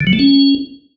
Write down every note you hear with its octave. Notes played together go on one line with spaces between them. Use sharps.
D3
F#3
A3
C#4